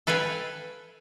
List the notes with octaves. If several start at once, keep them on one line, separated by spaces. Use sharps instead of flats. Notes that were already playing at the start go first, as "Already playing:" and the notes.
A4 B4 F5 G5 G#5